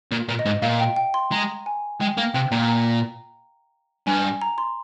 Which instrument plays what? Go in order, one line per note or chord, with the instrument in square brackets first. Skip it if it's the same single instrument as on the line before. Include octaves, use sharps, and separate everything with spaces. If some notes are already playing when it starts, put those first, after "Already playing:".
[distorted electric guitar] A#2
A#2
[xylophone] D#5
[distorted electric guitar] G#2
[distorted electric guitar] A#2 [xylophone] F5
[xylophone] G5
G5
C6
[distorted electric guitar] G#3 [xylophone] A#5
[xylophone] G#5
[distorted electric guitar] G#3 [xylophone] G5
[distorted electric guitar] A#3 [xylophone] F5
[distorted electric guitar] C3 [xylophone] G5
[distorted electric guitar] A#2 [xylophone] A#5
[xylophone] A#5
[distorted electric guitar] G2 [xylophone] G#5
[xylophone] A#5
C6